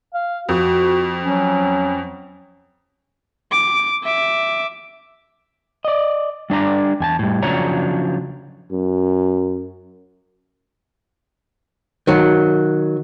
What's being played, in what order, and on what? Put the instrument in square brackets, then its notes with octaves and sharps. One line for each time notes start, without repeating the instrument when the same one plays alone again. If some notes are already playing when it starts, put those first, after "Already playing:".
[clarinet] F5
[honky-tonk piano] F2 [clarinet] F#4
[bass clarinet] F#3 [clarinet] C#4
[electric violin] D6
E5 D6
[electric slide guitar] D5 D#5
G3 D4 D5 A#5
E2 G#5 A5
A2 G3
C#3 F3 F#3 D4 C#5 A#5
[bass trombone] F#2
[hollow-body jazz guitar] D#3 F#3